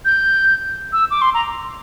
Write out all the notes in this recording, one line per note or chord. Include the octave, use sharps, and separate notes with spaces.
G6
E6
D6
C6
A#5